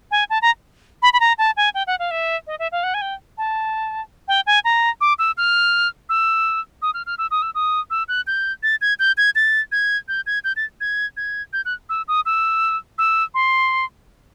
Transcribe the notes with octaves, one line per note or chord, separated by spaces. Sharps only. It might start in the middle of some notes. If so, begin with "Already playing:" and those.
G#5
A5
A#5
B5
B5
A#5
A5
G#5
G5
F#5
F5
E5
D#5
E5
F5
F#5
G#5
G5
A5
G5
G#5
A#5
D6
E6
F6
E6
D#6
F6
F6
E6
D#6
E6
D#6
E6
F#6
G6
A6
G#6
G6
G#6
A6
G#6
G6
G#6
G6
A6
G#6
G#6
G6
F#6
E6
D#6
E6
E6
C6